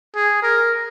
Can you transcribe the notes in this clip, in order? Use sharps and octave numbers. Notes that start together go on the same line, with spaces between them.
G#4
A#4